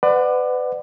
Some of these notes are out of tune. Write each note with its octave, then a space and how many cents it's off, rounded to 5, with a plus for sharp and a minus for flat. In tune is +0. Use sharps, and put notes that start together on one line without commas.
B4 +35 D5 +25 F#5 +0